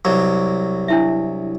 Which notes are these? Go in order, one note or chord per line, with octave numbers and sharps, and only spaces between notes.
C2 F#3
D4 E4 E5